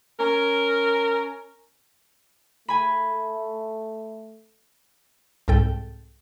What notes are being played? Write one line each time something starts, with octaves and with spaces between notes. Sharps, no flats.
C#4 A#4
A3 G#5 B5
C2 G#2 A4 G5